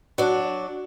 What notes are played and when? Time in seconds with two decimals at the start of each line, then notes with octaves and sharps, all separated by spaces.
0.18 F#3 D4